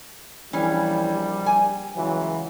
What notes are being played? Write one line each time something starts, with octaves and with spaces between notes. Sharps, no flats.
A#1 E3 G3 C#4
G#5
C#2 E3 F#3